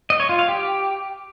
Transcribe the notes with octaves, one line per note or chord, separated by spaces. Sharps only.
D#5
C#5
F4
F5
G4